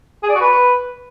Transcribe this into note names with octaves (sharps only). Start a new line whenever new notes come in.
G#4
D5
F#4
B4